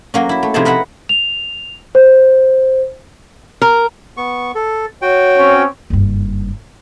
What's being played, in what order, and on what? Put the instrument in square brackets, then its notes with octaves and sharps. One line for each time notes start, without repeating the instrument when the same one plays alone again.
[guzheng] F#3 A#3 C#4
E4 E5
A3
C3 F3 D#4 E4 G#4 A5
A#4 B4 E5 F#5 B5
[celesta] F7
C5
[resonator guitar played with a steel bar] A#4
[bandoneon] B3 C#6
A4
[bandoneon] F#4 G5 [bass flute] C#5
[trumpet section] C4 C#4
[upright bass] F#1 G2